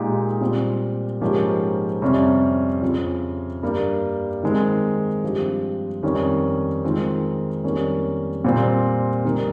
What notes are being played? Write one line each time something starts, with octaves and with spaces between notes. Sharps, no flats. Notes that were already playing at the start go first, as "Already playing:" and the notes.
Already playing: A#2 G#3 D#4 G4
A#2 G3 C4 F4
G#2 F3 A#3 C#4 G4
F2 C3 G3 C#4
F2 C#3 F3 C4 F4
G2 G3 A#3
D#3 G#3 C4
G2 F3 C4 G4
F2 D#3 G3 C#4
D#3 G#3 C4 F4
F2 D#3 G3 A#3 C#4
A#2 G3 C4
F2 D#3 G3 A#3